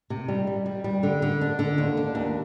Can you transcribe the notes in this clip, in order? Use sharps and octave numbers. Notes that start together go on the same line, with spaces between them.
C3
G3
G3
G3
G3
D3
D3
D4
D3
D#2
D4
D#2